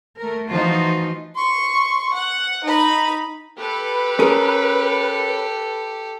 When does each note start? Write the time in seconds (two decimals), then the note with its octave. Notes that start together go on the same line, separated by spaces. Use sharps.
0.19 A3 A#4
0.49 E3 F3 D#4 F4 F#4
1.35 C6 C#6
2.13 F#5
2.64 D#4 B5
3.58 G4 A4 B4
4.19 C#4 G#4 A#4